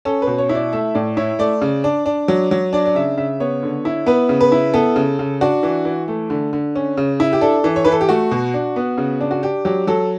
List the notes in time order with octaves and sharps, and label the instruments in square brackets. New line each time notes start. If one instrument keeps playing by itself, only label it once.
[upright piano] C#4 A4
B4
B2
C#5
E4
D5
A3 E5
A2 D5
E4 C#5
A3 D5
C#3
D4
D4
F#3
F#3
D4 D5
D5
C#3 E5
C#3 E5
B3 C#5
D3
E4
B3 B4
C#3
B4
E4
B3 A4
C#3
C#3
D4 F#4
E3
E3
A3
D3
D3
C#4
C#3
E4
G4
D4 A4
E3
C#5
E3 B4
A4
G4
A3 F#4
B2
D4
B3
C#3
D4
F#4
D4 G4
F#3 G4
F#3 A4